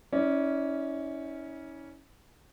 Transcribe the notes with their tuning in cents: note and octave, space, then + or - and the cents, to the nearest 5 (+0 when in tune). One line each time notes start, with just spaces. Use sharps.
C#4 +0 E4 -45 D5 -15